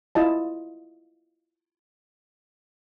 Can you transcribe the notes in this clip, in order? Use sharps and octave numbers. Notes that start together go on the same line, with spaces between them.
E4 F4 D#5 A5